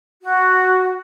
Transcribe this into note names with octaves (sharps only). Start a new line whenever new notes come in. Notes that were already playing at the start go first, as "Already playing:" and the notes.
F#4